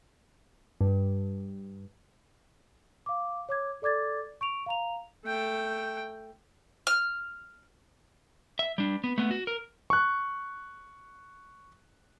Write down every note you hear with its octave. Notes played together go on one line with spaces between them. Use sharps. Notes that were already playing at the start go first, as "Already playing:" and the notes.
G2
F5 D6
C#5 D6 G#6
A4 D5 D6 G#6 A6
C#6 D7 F7
F5 A#5 F7
A3 G5
F6
E5
G3 D4
B3
A3 B3
F#4
A#4
C#6 F#6